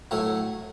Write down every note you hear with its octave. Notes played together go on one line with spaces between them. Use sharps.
A2 F#3 A3